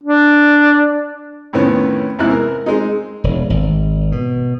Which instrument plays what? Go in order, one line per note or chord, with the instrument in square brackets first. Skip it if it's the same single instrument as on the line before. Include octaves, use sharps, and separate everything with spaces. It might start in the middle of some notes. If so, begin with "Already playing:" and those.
[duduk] D4
[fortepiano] F2 A2 D#3 B3 C#4
E2 G#2 C3 E4 F#6
A#4
G#3 C4 D#4
[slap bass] E1
G#1
B2